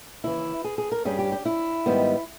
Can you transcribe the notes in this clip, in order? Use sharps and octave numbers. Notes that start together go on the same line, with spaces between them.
D#2 C#3 E3 E4
G#4
G#4
A#4
G2 G3 C#4 G#4
G4
G4
E4
G#2 D#3 G3 B3